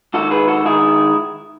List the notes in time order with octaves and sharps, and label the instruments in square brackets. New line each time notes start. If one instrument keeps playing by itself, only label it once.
[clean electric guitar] G#2 D#3 F#4 A4
G#4 B4
F#4 A4
G#2 D#3 E4 G#4